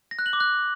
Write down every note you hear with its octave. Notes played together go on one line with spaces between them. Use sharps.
A#6
F#6
F#7
D6
F#6